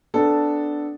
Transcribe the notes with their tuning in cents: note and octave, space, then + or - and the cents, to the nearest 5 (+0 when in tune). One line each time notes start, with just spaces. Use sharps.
B3 +20 D4 +0 A4 +0